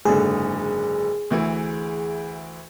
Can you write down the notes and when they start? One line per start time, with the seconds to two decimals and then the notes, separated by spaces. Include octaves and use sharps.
0.05 F#1 G#2 D3 G#4
1.31 D2 E3 E4